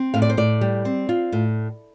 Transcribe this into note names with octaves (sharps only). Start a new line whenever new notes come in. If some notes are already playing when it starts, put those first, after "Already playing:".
Already playing: C4
A2 F5
D5
C5
A2 D5
G3
C4
F4
A2